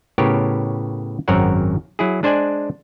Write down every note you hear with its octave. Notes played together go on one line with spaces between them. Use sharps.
A2 C#3 B3 G4 A#4 C#5
G#1 F#2 C4 A#4 C#5 F#5
F#3 E4 G#4
G#3 D4 C5 D5 G#5